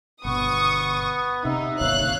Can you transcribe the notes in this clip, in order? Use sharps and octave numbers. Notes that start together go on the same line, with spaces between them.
G1 B2 B3 C#6 D#6
C3 D#4 E5
G1 D#2 C3 C#5 F5 F#6